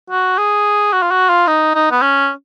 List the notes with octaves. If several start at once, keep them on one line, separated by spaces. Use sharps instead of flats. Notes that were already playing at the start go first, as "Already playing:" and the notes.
F#4
G#4
F#4
F4
F#4
F4
D#4
D#4
B3
C#4